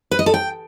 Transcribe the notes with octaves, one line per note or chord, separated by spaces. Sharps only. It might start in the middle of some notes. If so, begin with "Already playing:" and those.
B4
D#5
A4
G5